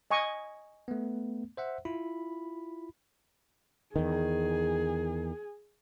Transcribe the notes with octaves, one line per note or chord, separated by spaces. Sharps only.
D#5 G#5 C#6
A3 B3
C5 E5 F#5
E4 F4 B5
E2 D#3 G#4